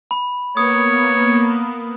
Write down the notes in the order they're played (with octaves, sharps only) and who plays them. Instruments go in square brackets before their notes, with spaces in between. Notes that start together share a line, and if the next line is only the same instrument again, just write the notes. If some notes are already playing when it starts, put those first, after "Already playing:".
[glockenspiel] B5
[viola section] A#3 B3 [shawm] C#5 [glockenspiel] D#6